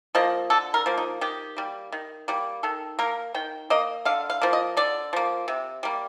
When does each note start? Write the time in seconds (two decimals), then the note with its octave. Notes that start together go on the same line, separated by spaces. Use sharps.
0.15 F3 A#3 D#5
0.50 D3 A4
0.74 A#4
0.86 F3 A#3
0.98 D#4
1.21 D#3 G4
1.57 G3 A#3
1.92 D#3
2.28 G3 A#3
2.63 D#3 A4
2.99 A#3 A#4
3.34 D#3 G5
3.70 A#3 D#5
4.05 D3 F5
4.30 F5
4.42 F3 A#3
4.53 D#5
4.77 D3 D5
5.13 F3 A#3
5.48 C3
5.83 G3 A#3